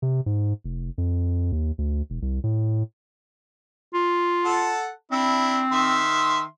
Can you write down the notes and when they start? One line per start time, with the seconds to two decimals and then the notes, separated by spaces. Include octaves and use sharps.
0.02 C3
0.26 G#2
0.64 F1
0.98 F2
1.52 D#2
1.78 D2
2.10 E1
2.22 C2
2.44 A2
3.94 F4
4.45 A4 F#5 A5
5.12 C4 D4 E4
5.72 D#3 E5 C6